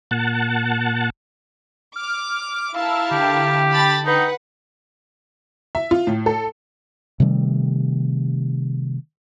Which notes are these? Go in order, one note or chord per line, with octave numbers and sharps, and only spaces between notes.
A#2 F#5 A5
D6 F6
E4 A#4 F5 A5 E6
D3 G4 G5
A5 B5 A6
D#4 B4 F#5
E5
F4
A2
A4
C3 D#3 G3 A3